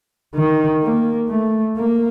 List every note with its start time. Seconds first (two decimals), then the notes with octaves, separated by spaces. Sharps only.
0.35 D#3
0.83 A#3
1.29 A3
1.77 A#3